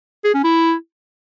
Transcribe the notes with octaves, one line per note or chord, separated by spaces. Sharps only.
G#4
C#4
E4